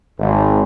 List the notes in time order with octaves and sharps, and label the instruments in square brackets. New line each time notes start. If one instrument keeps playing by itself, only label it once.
[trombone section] G#1